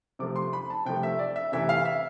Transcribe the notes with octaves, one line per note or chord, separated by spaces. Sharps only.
C3 F3 A3 D6
C6
B5
A5
C3 F3 A3 G5
E5
D5
E5
C3 E3 A3 E5
F5
E5